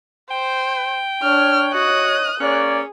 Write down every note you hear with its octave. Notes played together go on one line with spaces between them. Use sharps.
C5 G5
D4 C#5 F6
F#4 D#5 D#6 F#6
A#3 C#4 G#4 C#5 D5